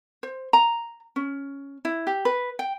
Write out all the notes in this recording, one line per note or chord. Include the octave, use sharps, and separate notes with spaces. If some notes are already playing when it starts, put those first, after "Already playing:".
C5
A#5
C#4
E4
G4
B4
G5